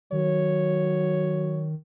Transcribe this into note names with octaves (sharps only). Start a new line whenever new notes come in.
D#3 F#3 C#5